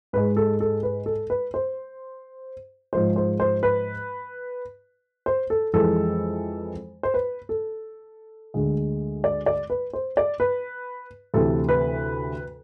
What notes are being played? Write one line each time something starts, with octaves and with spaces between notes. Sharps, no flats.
G#2 G#3 B4
A4
A4
B4
A4
B4
C5
G#2 F3 G#3 C5
C5
C5
B4
C5
A4
F2 E3 G#3 A4
C5
B4
A4
D2 D3 G#3
D5
D5
B4
C5
D5
B4
D2 C3 E3 A4
B4